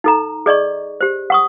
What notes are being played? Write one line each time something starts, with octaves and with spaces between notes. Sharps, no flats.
D#4 A4 A#5
G#4 D5 D#5 C#6
G4 C5
F#5 C#6 D#6